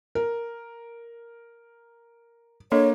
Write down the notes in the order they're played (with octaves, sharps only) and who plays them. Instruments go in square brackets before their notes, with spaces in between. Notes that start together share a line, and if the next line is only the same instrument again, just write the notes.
[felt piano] A#4
[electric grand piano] A#3 [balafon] D4 A4 D#5 [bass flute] C#5